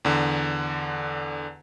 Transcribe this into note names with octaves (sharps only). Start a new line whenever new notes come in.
E2 D3